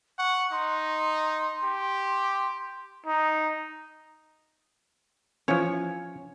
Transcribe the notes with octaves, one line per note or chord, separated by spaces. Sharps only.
F#5 C#6
D#4 C6
G4
D#4
E3 F3 C#4 C#5